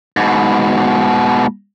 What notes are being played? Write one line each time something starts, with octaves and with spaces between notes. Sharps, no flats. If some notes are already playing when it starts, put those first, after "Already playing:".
G#2 B2